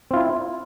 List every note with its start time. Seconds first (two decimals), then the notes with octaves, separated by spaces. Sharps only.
0.11 C4
0.14 F4
0.16 E4